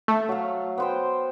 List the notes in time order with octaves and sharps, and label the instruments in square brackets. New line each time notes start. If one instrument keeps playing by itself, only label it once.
[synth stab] A3
[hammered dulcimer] F#3 F5
B3 C5 G5